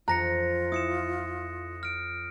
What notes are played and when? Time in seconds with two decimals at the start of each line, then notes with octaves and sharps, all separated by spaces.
0.08 F2 F4 A#5 F#6 A#6 C#7
0.72 E4 D#6 C#7 E7
1.83 F6 D7